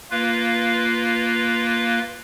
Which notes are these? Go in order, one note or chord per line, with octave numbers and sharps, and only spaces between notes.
A#3 F4 B4 F5